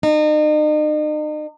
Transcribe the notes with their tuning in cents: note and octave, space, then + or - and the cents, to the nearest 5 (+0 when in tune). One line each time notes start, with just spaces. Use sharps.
D#4 -40